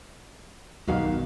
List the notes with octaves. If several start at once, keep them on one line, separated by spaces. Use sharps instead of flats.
B1 G2 D#3 F#4 F5